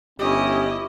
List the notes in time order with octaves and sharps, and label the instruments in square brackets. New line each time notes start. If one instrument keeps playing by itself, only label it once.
[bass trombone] G1 [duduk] C#4 [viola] E4 D#5 [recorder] G4